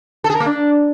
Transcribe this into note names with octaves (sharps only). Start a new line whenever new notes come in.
A4
G#4
A#4
A#3
D4